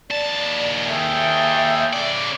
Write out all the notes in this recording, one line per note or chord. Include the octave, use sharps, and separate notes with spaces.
D#2 D5 A5
G#4 A4 E5 G5
C#3 D5